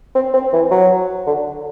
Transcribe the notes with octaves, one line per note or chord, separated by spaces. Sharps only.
C4
C4
E3
F#3
D3